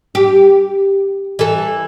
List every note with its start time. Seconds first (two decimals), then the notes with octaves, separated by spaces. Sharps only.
0.15 G4
1.39 E3 A4